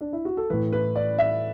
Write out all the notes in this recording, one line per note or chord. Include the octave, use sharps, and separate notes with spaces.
D4
E4
F#4
A4
A2 E3 B4
B4
D5
E5